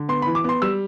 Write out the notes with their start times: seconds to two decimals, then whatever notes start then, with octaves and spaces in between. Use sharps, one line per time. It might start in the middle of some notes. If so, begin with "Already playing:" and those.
Already playing: D3
0.09 B3 C6
0.22 E3 B5
0.35 D6
0.44 B3 C6
0.62 G3 E6